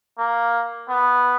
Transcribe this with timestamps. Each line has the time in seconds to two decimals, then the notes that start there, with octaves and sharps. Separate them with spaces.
0.19 A#3
0.89 B3